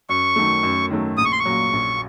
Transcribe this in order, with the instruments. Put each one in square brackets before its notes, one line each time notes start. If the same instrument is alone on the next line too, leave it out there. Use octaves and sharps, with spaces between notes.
[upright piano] F#2 [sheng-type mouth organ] C#6
[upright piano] D#3 F#3 A3
F#2
D#3 F#3 A3
[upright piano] A#1 [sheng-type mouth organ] D#6
[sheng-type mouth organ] C#6
C6
C#6
[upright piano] A#2 F#3
A#1